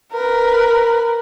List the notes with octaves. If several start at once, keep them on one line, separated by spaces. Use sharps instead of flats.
A#4 B4